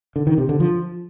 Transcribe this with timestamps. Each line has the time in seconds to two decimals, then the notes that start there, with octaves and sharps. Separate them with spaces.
0.16 D3
0.27 D#3
0.38 C3
0.49 D3
0.60 F3